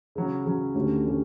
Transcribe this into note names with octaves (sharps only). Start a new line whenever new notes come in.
C#3 F#3 C#4
C#3 F#3 C#4
D2 D3 A3 C#4 G4
D3 A3 C#4 G4